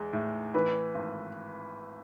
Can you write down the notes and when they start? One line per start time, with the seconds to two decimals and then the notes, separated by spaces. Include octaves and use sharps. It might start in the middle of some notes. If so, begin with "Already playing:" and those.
Already playing: E2 G#3
0.13 A2
0.54 E3 B4
0.95 G#1